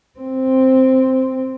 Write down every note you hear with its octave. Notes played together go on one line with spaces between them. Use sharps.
C4